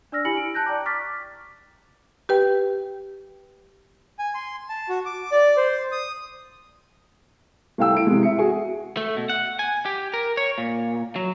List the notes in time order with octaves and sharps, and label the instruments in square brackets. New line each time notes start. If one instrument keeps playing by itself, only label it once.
[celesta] D4 D5 E6 F6 A#6
E4 G4 G#5 B5 C#7 F#7
D7
A5 F#6 G6 A#6
D5 G5 A#5 D6
C#6 D6 F6 A6 B6
[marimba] G4 B4 G5
[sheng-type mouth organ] G#5
C6
A5
F#4
D6
D5
C5
D#6
[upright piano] C2 A3 F5 G5 E6
E4 D7
C3 E3 G#3
E5 C#7
F#4 G#4 G#5
[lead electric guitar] A3
B2
F#5
G#5
G4
A#4
C#5
A#2
F#3